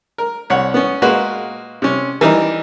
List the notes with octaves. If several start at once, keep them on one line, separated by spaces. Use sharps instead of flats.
A#4
C2 C#5 F#5
B3 C#4
A#2 G#3 A#3 F#4 B4
C3 C#4
E3 G3 D#4 A#4